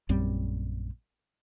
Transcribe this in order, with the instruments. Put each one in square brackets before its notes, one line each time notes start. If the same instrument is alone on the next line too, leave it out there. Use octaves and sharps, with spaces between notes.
[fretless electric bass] A#1 F#2 G3 C4